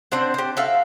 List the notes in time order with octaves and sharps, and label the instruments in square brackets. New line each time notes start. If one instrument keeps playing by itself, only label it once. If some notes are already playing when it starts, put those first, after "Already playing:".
[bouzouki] C4 D4 C5 F#5
G4 C5
F#4 A4 E5 F5